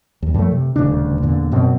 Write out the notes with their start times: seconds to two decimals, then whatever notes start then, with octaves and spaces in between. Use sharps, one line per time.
0.22 D#2
0.34 F#2 F3 A3
0.52 C3
0.76 D#1 D2 C#3 D4
1.22 E2 A#2 D3
1.52 F#2 B2 C4